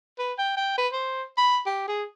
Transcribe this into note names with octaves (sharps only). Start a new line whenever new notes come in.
B4
G5
G5
B4
C5
B5
G4
G#4